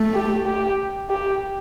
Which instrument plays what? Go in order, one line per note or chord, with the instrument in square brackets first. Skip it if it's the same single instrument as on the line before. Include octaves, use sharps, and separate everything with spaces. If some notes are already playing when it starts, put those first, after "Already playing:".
Already playing: [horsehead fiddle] A3
[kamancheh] G4
G4
G4